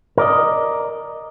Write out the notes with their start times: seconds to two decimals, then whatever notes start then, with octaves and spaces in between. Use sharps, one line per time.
0.18 A#4 D5 D#5